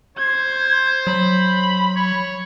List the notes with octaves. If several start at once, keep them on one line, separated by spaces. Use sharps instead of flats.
C5 G#6
F#3 B5
C#5